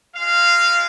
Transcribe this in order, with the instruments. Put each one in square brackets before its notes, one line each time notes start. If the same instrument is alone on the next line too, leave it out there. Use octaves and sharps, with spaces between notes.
[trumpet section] G#3 F4 F5